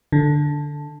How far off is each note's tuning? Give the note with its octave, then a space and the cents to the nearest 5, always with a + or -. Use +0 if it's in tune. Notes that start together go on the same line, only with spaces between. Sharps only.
D3 +0